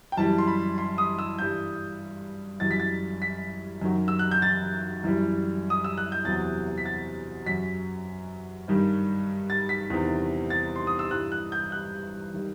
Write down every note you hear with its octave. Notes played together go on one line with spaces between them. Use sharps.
G5
F#2 E3 G3 A5
C6
B5
C6
D#6
E6
G2 E3 G3 G6
F#2 E3 G3 A6
B6
A6
B6
F#2 D#3 F#3
E6
F#6
G6
A6
F#2 E3 G3
D#6
E6
F#6
G6
E2 C3 F#3 A6
B6
A6
F#2 F#3 B6
G2 D#3 G3
A6
B6
E2 C3 D#3
A6
C6
D#6
E6
G2 E3 G3 F#6
F#6
G6
F#6
D#3 G3